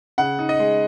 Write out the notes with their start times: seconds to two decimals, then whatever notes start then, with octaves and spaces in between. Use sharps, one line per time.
0.18 C#3 F#5
0.39 D#4
0.49 D#5
0.59 G#3